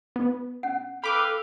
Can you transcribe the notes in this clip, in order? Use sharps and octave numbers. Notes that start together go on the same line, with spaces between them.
B3
C#4 F#5
A4 B4 F5 G5 B5 D6